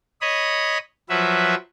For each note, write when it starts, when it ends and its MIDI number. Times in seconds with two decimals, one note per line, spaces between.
0.21 0.78 73
0.21 0.78 75
0.21 0.78 83
0.21 0.78 87
1.09 1.55 53
1.09 1.55 54
1.09 1.55 71
1.09 1.55 76